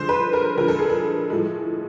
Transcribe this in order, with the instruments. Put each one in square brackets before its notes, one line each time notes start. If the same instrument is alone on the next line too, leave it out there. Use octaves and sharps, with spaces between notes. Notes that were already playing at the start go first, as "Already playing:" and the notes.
Already playing: [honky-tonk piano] D3 F3 G#3 C5
B4
A#4
D3 F3 G#3 A#4
A4
G#4
A4
A2 F3 G#3